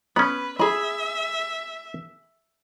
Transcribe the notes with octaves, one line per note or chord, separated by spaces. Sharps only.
B3 C#4 B4 B5
G#4 E5 B5